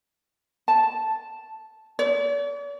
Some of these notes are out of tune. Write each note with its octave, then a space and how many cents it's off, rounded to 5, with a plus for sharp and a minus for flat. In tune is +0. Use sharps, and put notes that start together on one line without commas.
A5 -5
D5 -45